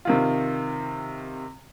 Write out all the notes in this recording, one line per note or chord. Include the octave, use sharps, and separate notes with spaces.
C3 D#3 F4